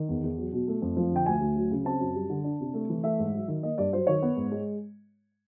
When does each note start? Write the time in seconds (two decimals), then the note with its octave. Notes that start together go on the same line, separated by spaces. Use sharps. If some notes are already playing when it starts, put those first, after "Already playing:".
Already playing: D#3
0.09 E2
0.23 E2
0.38 F#3
0.53 B2
0.68 A3
0.82 F2
0.97 F3
1.12 D3 G5
1.26 D2 G#5
1.41 D2
1.56 F#3
1.71 C#3
1.85 C4 A5
2.00 F#2
2.15 G3
2.30 D3
2.44 D4
2.60 C3
2.74 A3
2.90 E3
3.04 A3 E5
3.19 G#2
3.34 F#3
3.48 D#3
3.62 A#3 D#5
3.78 G2 D5
3.93 F#3 C5
4.07 D#3 C#5
4.22 B3
4.37 G#2
4.52 G#3